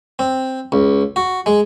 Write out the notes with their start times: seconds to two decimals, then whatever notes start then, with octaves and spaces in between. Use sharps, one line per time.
0.19 C4
0.72 C#2
1.16 F#4
1.46 G#3